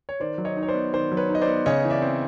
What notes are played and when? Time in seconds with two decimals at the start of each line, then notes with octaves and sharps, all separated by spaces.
0.09 C#5
0.20 D#3 C5 D5
0.38 F#3
0.45 C#5 D#5
0.57 D#4
0.63 C#5
0.68 C5 D5
0.74 B3
0.93 D#3 C5 D5
1.12 F#3
1.17 B4 C#5
1.30 D#4
1.35 D#5
1.42 C5 D5
1.48 B3
1.66 C#3 C#5 D#5
1.85 E3
1.90 D5 E5
2.02 C4